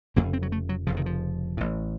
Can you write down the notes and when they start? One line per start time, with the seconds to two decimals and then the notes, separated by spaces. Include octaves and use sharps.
0.16 F1 F2 C#3 A#3
0.33 C4
0.43 F#3
0.52 A3
0.69 F#3
0.87 F1 F2 C#3 F3
0.97 D#3
1.06 F3
1.57 A1 A2